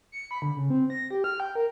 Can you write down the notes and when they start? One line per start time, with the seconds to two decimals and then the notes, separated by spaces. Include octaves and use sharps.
0.12 C#7
0.31 B5
0.42 D3
0.56 C#3
0.70 C4
0.90 A#6
1.11 G4
1.24 F6
1.40 G5
1.55 A#4